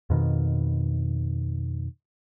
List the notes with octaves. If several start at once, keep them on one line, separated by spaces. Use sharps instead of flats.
F2 B2 D#3